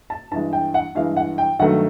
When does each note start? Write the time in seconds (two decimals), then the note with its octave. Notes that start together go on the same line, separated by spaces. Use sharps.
0.10 A5
0.31 G2 E3 G#3 A5
0.53 G5
0.74 F#5
0.95 G2 E3 G#3 F5
1.17 F#5
1.38 G5
1.59 G2 D#3 F#3 A3 F#5